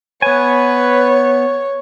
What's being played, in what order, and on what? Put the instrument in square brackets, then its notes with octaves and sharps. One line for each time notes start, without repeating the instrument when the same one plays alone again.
[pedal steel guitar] B3 G#5 [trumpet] B4 [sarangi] C#5